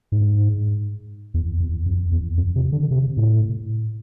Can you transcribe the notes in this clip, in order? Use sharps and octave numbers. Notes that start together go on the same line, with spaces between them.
G#2
E2
E2
F2
E2
F2
C3
D3
C3
A2